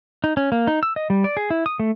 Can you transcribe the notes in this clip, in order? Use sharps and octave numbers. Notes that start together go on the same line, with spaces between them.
D#4
C#4
A#3
D#4
E6
D#5
G3
D5
G#4
E4
D#6
A3